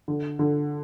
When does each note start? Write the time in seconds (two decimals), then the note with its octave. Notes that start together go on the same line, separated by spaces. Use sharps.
0.08 D3
0.39 D3